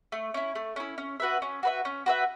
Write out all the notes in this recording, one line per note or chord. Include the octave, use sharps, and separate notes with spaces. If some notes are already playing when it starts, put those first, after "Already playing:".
A3
C#4 E4
A3
C#4 E4
C#4
F#4 B4 E5
C#4
F#4 B4 E5
C#4
F#4 B4 E5